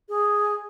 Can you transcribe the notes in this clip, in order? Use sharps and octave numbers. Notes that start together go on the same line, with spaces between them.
G#4